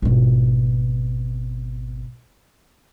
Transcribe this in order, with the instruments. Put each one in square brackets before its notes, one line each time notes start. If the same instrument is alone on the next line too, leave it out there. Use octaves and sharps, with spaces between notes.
[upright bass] G#1 B2